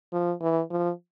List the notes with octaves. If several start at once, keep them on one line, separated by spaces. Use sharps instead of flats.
F3
E3
F3